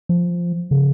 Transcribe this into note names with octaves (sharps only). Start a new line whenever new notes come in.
F3
C#3